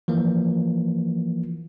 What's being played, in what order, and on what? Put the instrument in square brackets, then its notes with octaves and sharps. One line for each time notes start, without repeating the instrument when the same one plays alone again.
[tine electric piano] E3 F3 A#3